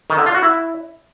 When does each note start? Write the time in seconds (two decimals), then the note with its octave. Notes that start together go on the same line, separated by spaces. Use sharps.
0.10 D#3
0.18 D3
0.26 F4
0.34 F#4
0.43 E4